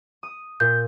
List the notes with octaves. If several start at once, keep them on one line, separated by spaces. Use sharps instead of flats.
D#6
A#2 G6